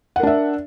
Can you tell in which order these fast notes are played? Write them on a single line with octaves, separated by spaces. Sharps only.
F#5 A#4 D4 E5